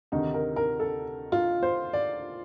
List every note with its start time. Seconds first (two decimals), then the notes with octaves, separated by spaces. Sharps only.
0.12 D2 C3 D#3 D#4
0.34 A#4
0.56 A#4
0.80 A4
1.32 F4
1.63 C5
1.93 D5